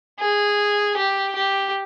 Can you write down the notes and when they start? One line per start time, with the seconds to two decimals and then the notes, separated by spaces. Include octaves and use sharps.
0.20 G#4
0.97 G4
1.36 G4